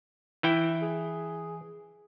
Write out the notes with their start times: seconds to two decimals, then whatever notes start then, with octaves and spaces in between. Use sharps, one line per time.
0.43 E3 E4 G5
0.82 G#4